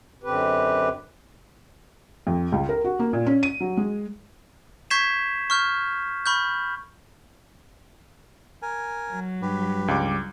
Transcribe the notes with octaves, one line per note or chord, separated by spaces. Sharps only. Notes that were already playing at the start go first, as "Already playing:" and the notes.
F#2 D3 C4 G4 B4
F2
C#2
A#4
F#4
A#3
A#2
C#4
D#7
F#3
G#3
C#6 G6 G#6 B6 C7 E7
C#6 F6 G6
B5 C#6 F6 G6
A#4 G#5
F#3
G2 G4 B4
C#2 G3 D6